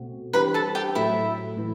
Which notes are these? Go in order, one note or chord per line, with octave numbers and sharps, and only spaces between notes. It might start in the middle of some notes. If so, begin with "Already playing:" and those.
Already playing: B2 A3 C4 F#4
E3 G3 D4 G4 B4 C5 B5
A4 A5
G4 G5
A2 F#3 A3 E4 E5
A2 E3